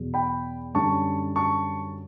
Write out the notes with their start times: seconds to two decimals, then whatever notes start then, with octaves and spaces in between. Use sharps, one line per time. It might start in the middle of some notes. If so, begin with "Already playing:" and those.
Already playing: E2 B2 F#3
0.14 G5 B5
0.74 F#2 D3 G3 C#4 A5 C#6
1.36 A5 C#6